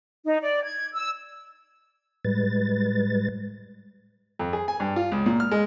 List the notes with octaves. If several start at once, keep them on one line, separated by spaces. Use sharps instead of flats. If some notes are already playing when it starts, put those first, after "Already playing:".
D#4
D5
G#6
E6
A2 G3 G#3 B4 A6
F2
G#4
G#5
G2
F4
C#2
A#2
F6
G#3